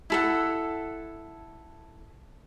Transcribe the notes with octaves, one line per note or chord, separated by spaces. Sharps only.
E4 A4 F#5